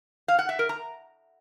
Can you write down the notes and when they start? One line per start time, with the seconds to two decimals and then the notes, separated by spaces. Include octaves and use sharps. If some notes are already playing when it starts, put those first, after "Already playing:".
0.28 F5
0.39 F#5
0.49 E5
0.59 A#4
0.69 A#5